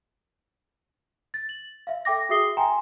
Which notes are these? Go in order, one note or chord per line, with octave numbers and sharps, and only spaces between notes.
A6
F#7
E5 F5
A4 E5 G5 D6 A#6
F#4 G#4 E5 D#6 C7 G7
G5 G#5 A#5 C6